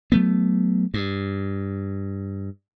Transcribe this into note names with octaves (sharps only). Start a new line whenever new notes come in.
F#3 A3 B3
G2